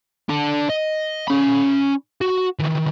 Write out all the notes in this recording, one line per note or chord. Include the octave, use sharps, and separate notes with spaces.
D4 A4
D#5
C#4 B5
F#4
D#3 E3